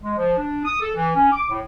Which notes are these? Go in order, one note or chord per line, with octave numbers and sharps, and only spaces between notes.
G#3
F3
D4
D#6
A4
E3
C#4
D6
A2